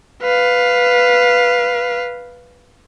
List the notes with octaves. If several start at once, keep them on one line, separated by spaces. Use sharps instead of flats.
B4 F5